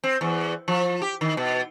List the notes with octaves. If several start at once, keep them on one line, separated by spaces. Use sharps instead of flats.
C4
E2
F3
G4
D#3
B2